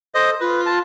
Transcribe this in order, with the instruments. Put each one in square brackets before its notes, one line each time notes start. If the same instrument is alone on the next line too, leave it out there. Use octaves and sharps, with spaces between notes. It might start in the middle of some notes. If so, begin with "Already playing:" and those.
[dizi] A4 [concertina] C5 D#5
[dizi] F4 [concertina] B4
[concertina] A5